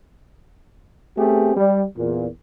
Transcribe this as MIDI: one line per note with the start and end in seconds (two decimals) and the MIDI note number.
1.18 1.54 57
1.18 1.54 59
1.18 1.54 60
1.18 1.54 67
1.18 1.54 68
1.57 1.82 55
1.97 2.26 40
1.97 2.26 46